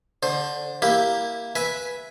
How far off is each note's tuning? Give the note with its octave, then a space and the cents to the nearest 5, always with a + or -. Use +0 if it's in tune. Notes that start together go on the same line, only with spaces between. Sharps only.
D3 +0 C5 +15
A#3 +0 E4 -5 G4 +0
B4 -10 E5 +0 G#5 +5